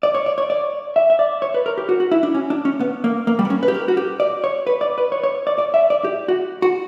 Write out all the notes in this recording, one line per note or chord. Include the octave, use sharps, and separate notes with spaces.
D5
C#5
D5
C#5
D5
E5
E5
D5
C#5
B4
A#4
G4
F#4
F#4
E4
D4
C#4
D4
C#4
B3
A#3
A#3
G3
B3
C#4
B4
G4
A#4
F#4
G4
D5
C#5
B4
D5
B4
C#5
C#5
D5
D5
E5
D5
G4
F#4
F#4